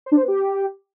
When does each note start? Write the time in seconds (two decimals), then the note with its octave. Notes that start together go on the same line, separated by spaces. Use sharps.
0.06 C5
0.12 D4
0.17 C5
0.22 B3
0.28 G4